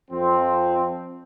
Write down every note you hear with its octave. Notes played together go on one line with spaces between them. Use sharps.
F2 F3 C4